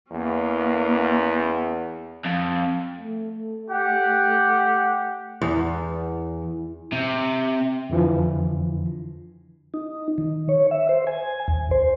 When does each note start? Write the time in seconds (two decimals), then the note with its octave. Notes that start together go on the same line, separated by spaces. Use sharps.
0.11 E2 A#3 C#4
2.25 F2
3.00 A3
3.70 G4 F#5
5.42 E2
6.92 C3
7.90 F2 D3 E3 F3
9.74 D#4
10.18 D#3
10.49 C#5
10.71 E5
10.89 C5
11.07 G#5
11.48 D#2
11.71 C5